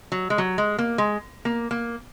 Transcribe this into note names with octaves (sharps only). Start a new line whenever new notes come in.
F#3
G#3
F#3
G#3
A#3
G#3
A#3
A#3